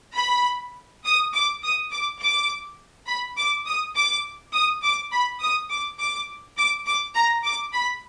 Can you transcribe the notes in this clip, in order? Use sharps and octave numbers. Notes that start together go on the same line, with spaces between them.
B5
D#6
D6
D#6
D6
D6
B5
D6
D#6
D6
D#6
D6
B5
D#6
D6
D6
D6
D6
A#5
D6
B5